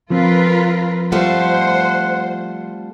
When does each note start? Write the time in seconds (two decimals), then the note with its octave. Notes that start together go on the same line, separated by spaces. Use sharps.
0.10 F3 C4 F4 A#4 B4
1.12 G3 A3 F4 C5 F#5